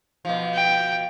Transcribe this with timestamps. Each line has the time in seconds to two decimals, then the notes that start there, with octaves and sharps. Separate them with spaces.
0.25 B2 F3
0.55 G5